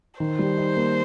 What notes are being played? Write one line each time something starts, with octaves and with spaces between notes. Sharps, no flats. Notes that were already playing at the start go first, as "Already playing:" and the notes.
D#3 C5
G3
D#4
A#3